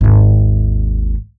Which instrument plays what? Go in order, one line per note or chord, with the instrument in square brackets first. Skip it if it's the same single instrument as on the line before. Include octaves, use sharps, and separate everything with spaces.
[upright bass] G#1 D#2